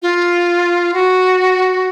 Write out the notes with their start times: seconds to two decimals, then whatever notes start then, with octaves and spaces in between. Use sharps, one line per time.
0.02 F4
0.94 F#4